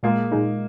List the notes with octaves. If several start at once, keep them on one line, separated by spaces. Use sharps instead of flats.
A#2 G#3 A#3 F4 G#4
A#2 G#3 D#4